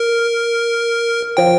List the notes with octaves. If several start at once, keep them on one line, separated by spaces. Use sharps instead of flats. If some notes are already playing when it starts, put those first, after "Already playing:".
Already playing: A#4
F3 G5